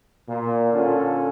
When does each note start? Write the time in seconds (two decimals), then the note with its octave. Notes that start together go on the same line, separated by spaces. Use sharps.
0.28 A#2
0.72 D3 C#4 F4 A4